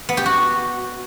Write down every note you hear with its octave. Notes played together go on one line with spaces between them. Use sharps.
B3
G4
F#4